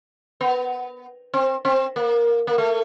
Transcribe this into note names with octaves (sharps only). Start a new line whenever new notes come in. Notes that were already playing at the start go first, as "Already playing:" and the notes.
B3
C4
C4
A#3
A#3
A3